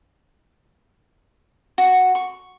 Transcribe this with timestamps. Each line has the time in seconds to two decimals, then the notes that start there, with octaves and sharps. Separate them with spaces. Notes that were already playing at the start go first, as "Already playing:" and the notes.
1.78 F#4
2.15 C#6